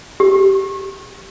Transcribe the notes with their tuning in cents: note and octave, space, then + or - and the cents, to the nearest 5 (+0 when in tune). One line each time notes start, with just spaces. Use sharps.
G4 -20